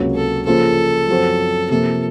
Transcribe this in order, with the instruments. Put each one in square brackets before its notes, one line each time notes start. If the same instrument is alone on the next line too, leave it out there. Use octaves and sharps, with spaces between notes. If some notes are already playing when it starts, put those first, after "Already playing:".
Already playing: [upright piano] C#2 C3 F#3 A#3 C#4
[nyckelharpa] A4
[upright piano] C#3 F3 A#3 F4 C5 [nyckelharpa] A4
[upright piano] F#2 F3 C4 F#4 C5
[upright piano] C3 F3 A#3 F4 [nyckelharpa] A4